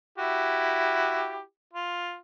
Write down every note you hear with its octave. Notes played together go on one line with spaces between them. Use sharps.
E4 F#4 G4
F4